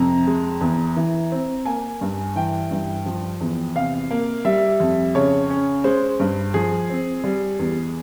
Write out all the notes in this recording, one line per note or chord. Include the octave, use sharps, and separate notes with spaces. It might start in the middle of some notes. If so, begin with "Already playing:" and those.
Already playing: F2 C3 A#5
G#3
E2
E3
C4
A#3 G#5
G2
E3 G5
G2
F3
E2
C3 F5
A#3
G3 E5
F2
C#3 C#5
C#4
G#3 C5
G2
F3 G#4
C4
G3
E2